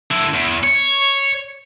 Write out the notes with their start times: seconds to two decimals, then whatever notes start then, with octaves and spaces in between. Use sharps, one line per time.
0.11 D3 E4
0.34 E2
0.64 C#5